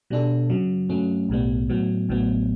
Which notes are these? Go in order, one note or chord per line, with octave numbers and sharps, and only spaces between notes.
B2 G3 D4 A4
F#2 C#3 F#3
G2 F#3 A3 C#4
B1 A2 G3 B3
A2 F#3 B3
A1 A2 F#3 B3